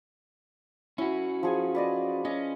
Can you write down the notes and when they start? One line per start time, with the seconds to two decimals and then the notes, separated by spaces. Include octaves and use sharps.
0.98 C#4 E4 F#4
1.43 F3 G#4 G#5
1.75 B4 D5 D#5
2.25 C#4 D#5